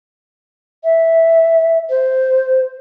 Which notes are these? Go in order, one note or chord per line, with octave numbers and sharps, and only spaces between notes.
E5
C5